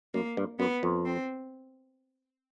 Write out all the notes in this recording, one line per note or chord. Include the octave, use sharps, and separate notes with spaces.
F#2 A#3
G2
F#2 B3
F2
C4